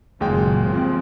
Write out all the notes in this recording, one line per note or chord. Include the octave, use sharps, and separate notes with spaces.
F#1 D#2 A#2 F#3 G#3 G5
C3 F3 C4